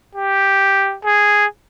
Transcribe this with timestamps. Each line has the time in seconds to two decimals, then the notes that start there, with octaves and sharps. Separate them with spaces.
0.15 G4
1.05 G#4